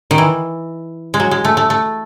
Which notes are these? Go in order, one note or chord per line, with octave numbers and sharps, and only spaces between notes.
D#3
E3
G#3
F#3
G#3
A3
A3
A3